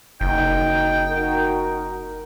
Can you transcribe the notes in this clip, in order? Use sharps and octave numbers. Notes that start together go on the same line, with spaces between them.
F#1 D#4 G5
D#4 F#4 A#4